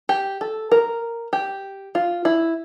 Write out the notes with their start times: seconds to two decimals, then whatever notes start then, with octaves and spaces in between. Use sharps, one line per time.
0.09 G4
0.41 A4
0.72 A#4
1.33 G4
1.95 F4
2.25 E4